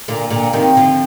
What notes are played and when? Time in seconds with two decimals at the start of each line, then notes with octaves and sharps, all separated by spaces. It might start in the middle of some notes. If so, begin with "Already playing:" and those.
0.08 A#2 D3
0.30 A#2 D3
0.53 C3 D#3
0.77 D3 F3